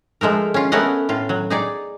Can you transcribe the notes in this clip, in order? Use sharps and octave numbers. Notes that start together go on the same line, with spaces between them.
F3 G#3 A3 A#4
C#4 F4
A3 B3 C#4 A#4 D#5 F#5
A2 F4
F#3
D#4 G#4 D5